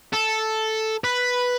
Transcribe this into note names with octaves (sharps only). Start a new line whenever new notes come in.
A4
B4